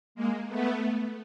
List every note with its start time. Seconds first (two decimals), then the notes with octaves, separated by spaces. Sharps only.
0.15 G#3 A#3
0.48 A3 B3